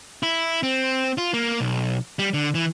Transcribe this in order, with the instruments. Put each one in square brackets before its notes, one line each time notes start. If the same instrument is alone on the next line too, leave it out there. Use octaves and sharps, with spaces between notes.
[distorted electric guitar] E4
C4
F4
A#3
B1
G3
D3
E3